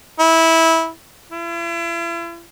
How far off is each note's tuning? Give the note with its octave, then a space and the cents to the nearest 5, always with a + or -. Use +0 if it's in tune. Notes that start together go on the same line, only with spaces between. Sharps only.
E4 -15
E4 +40